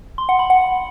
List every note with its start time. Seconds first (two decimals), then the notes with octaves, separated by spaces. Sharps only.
0.18 C6
0.29 F#5
0.39 B5
0.50 F#5